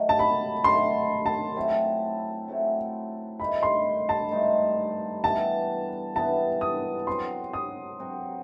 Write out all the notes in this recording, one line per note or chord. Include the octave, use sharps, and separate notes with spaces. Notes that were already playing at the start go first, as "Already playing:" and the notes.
Already playing: D#3 F#3 A3
A5
B5
D#3 F#3 A3 C6
A5
F#3 A3 C4 E4
F#3 A3 C4 E4
G2 D#3 A3 D#4 B5
C6
A5
G2 D#3 A3 D#4
E3 G3 B3 A5
E3 G3 B3 A5
D#6
F#3 C4 F#4 C6
D#6
F#3 C4 F#4